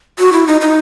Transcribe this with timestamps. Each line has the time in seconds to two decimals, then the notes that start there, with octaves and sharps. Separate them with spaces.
0.19 F#4
0.33 E4
0.47 D#4
0.61 D#4